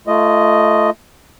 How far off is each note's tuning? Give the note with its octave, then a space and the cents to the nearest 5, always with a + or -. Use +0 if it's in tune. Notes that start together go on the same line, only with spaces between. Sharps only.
A3 +0 F4 -30 D#5 +0